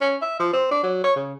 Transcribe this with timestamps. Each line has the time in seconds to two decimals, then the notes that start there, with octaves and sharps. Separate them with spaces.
0.01 C#4
0.22 E5
0.40 F3
0.53 C4
0.71 D4
0.83 F#3
1.04 C#5
1.16 C#3